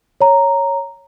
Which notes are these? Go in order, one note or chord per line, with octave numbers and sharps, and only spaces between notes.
C#5 A#5